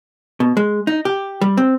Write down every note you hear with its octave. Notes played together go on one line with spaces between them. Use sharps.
B2
G#3
D#4
G4
G3
C4